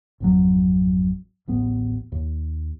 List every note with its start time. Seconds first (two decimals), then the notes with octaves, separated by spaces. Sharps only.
0.20 G#1 F2 F#3
1.48 D1 A1 B3
2.12 D#2